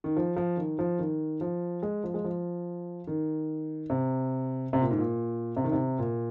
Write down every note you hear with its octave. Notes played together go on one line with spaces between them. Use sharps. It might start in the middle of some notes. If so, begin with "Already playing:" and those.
D#3
F3
F3
D#3
F3
D#3
F3
G#3
F3
G#3
F3
D#3
C3
C3
A#2
G#2
A#2
C3
D#3
C3
A#2